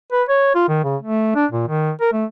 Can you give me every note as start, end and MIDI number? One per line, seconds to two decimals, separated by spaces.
0.12 0.23 71
0.29 0.50 73
0.55 0.67 65
0.69 0.82 51
0.84 0.96 49
1.02 1.32 57
1.35 1.46 62
1.52 1.67 46
1.68 1.91 51
2.01 2.10 70
2.13 2.25 57